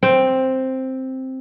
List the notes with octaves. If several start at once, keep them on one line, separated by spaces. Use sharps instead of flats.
C4